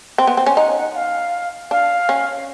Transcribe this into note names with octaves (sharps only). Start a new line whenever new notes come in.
C4 G5
B3
C4
C#4
D#4 F#5
F#5
F5
D4 F5
C#4